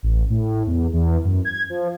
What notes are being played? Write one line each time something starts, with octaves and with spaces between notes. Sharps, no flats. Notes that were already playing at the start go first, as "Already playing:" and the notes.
A1
A2
E2
E2
F#2
G#6
F3